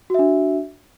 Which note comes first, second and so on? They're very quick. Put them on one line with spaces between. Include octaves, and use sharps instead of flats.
F#4 E5 D4